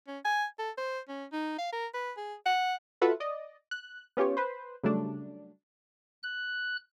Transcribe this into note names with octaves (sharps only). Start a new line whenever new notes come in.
C#4
G#5
A4
C5
C#4
D#4
F5
A#4
B4
G#4
F#5
F4 F#4 A4 B4 E5 F#5
D5 D#5
F#6
B3 C#4 F4 G4 C#5
B4 C5
C#3 F#3 G3 A3 D4
F#6